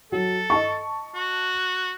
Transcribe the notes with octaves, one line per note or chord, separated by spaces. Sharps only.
F#3 A4
D#5 A5 C#6
F#4